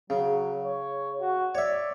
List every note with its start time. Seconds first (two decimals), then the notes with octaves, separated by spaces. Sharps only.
0.10 C#3 F#3
0.65 C#5
1.21 F#4
1.55 C#5 D5 E5